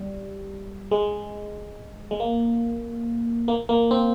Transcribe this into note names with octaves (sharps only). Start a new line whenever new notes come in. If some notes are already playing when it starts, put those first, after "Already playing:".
Already playing: G3
G#3
G#3
A#3
A#3
A#3
C4